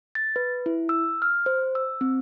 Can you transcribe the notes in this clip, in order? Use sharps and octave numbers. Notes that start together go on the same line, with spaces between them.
A6
B4
E4
E6
F6
C5
E6
C4